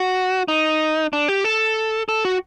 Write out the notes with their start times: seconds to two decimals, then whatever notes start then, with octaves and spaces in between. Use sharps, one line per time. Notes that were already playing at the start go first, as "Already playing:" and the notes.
Already playing: F#4
0.48 D#4
1.13 D4
1.28 G4
1.44 A4
2.09 A4
2.25 F#4